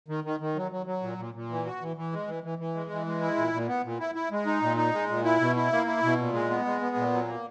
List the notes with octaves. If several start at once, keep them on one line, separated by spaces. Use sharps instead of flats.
D#3
D#3
D#3
F#3
F#3
F#3
A#2
A#2
A#2
E3
F#4
E3
E3
G#3
E3
E3
E3
G#3
E3
G#3
E4
A#2
A#2
B3
A#2
E4
E4
G#3
D#4
A#2
D#4
G#3
A#2
E4
B2
E4
A#3
E4
B2
A#2
G#3
B3
G#3
B3
A#2
F#3
A#3